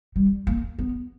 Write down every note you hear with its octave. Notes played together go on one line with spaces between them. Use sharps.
G3
A#3
B3